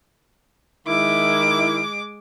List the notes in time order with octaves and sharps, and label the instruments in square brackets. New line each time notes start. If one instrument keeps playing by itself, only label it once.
[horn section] D#3 E4 [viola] G#3 D6